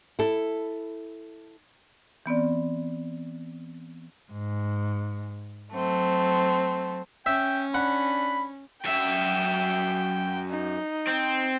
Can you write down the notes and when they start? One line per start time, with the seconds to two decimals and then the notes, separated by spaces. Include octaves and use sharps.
0.19 E4 A4
2.26 E3 B3 C4 D5
4.31 G#2
5.72 F#3 A3 C4
7.26 C#4 E5 G5
7.74 D4 F#5 B5
8.85 F#2 E5 G5
10.50 D#4
11.07 C4